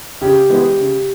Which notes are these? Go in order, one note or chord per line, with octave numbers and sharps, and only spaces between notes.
C#3 G4
E3 G#3 B3
C#3